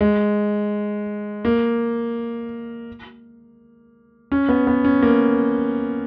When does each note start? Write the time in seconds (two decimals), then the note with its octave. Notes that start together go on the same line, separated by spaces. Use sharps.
0.01 G#3
1.45 A#3
4.32 C#4
4.49 B3
4.67 B3
4.85 C#4
5.02 A#3